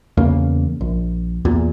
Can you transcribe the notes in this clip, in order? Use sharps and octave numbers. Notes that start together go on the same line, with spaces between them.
E2 C#3 A#3
A#1
E2 A#2